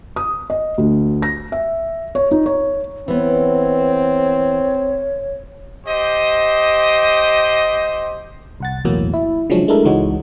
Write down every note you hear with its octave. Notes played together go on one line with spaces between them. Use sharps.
D#6
D#5
D2
A#6
E5
C#5
D#4
C#5
E3 B3 C4 C#5
G4 C5 D#5
C2 F#5 A6
B1 E2 A2 F#3 A#3
E4
C#3 F3 F#3 G#3 C#4 D4
G#3 A3 D4 E4 A4 A#4
C#2 E3 G#3 D#4 F#4 C#5